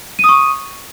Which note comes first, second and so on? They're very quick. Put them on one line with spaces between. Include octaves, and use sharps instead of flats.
D#7 D#6 C#6